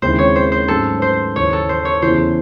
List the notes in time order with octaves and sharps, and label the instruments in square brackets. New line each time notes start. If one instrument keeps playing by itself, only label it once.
[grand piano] D#2 C#3 G#3 C4 E4 [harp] C5
[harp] C#5
C5
C5
[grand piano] G#2 F#3 A3 C#4 [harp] A4
[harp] C5
[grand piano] D#2 C#3 E3 [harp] C#5
[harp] A4
C5
C#5
[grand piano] E2 C#3 E3 [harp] C5